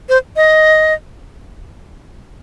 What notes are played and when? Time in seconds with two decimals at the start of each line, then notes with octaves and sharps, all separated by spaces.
0.09 C5
0.36 D#5